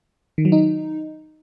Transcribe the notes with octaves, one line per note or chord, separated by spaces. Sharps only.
D#3
F#3
D#4